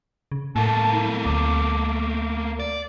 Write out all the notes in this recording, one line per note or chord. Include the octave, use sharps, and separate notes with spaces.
C#3
A2 A3 A#3 A5
E4
D2 D6
D5